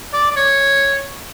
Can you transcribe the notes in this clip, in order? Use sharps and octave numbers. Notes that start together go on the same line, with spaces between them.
D5
D5
C#5